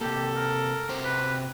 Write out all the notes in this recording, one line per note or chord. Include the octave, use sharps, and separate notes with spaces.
C3 A#3 G4 A4
A#4
C3 F#4 C5
B4